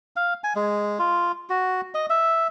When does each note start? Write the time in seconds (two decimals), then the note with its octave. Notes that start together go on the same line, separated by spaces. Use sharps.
0.16 F5
0.44 G#5
0.55 G#3
0.99 F4
1.49 F#4
1.94 D#5
2.10 E5